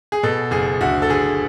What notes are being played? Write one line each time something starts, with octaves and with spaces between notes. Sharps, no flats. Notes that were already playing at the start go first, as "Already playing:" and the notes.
G#4
B2 A4
F#1 G#4
D2 F#4
A4
D2 G#4